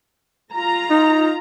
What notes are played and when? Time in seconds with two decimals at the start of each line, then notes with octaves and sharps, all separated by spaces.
0.54 F4 A#5
0.90 D#4